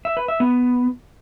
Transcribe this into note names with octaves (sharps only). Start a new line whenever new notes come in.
E5
B4
E5
B3